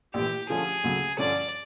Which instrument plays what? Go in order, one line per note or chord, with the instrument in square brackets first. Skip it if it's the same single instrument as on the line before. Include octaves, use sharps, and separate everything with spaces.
[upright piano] A#1 A2 E3 [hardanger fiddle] G4
[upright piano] D3 F3 A3 C#4 [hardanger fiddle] G#4
[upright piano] D2 C#3 F#3 A3
[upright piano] G2 D3 F3 A3 C#4 [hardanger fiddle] D5